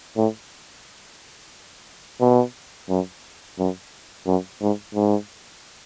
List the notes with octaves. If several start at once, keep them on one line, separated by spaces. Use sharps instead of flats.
A2
B2
F#2
F#2
F#2
G#2
G#2